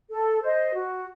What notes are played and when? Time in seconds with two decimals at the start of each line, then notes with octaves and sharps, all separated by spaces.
0.10 A4
0.42 C5 D#5
0.74 F#4